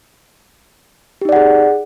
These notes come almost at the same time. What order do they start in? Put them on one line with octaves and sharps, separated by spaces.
G4 D#4 D5 F#5 G#4